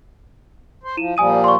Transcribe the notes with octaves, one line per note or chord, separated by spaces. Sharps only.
C5
F3 E4 D#7 E7
A#2 F3 G3 G#5 D#6 D#7
C6 C#6